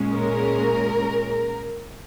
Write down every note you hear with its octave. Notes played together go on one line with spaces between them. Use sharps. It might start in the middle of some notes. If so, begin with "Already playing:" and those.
Already playing: A#2 G#3 C#4
A#4